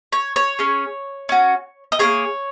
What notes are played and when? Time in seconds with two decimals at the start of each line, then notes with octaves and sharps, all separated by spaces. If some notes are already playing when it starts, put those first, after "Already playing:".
0.12 C#5
0.36 C#5
0.59 C#4 G#4
1.29 C#4 F#4
1.92 D#5
1.99 A#3 D#4 G#4 C#5